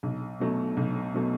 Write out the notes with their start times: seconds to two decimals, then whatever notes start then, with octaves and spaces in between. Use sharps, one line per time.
0.03 B1
0.40 B2 F#3 A3
0.77 B1
1.14 B2 F#3 A3